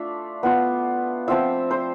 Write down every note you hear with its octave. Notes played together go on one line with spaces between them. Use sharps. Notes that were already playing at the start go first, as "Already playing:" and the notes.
Already playing: A3 D4 F4 E5
B3 F4
F3 C4 F4 E5
C5